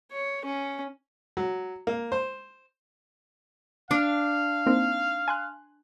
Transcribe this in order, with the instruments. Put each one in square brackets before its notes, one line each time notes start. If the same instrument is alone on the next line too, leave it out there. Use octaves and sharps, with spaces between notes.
[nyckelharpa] C#5
C#4
[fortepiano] F#3
A#3
C5
[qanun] D4 [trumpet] F5
[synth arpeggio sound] A#3 C4 D#4
G#5 C6 F#6